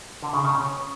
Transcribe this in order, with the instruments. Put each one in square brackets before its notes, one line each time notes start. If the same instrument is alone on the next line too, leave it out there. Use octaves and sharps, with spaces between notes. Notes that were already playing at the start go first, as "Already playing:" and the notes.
[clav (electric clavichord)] D3
C#3
C#3
C#4